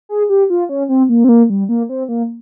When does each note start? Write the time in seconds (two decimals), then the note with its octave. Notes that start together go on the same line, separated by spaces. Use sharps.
0.09 G#4
0.29 G4
0.50 F4
0.69 C#4
0.89 C4
1.09 A#3
1.24 C4
1.29 A#3
1.50 G3
1.69 A#3
1.89 C4
2.09 A#3